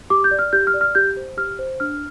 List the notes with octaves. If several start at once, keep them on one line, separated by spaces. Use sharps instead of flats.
G4 D6
G6
D5
F6
G4 G6
F6
D5
F6
G4 G6
C5
G4 F6
C5
D4 F6